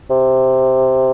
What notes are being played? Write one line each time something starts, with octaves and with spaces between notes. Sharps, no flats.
C3